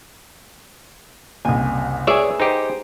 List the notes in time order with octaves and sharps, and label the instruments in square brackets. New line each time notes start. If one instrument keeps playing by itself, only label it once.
[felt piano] F#1 C2 [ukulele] G#5
[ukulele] G#4 B4 G#5 [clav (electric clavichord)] C#5 D5 E5
[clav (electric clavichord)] D#4 G4 [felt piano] C5